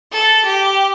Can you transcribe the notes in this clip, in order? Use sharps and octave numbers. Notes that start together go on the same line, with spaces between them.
A4
G4